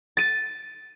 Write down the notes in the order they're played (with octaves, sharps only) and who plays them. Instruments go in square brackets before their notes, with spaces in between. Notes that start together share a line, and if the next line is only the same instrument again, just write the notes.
[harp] A6 D#7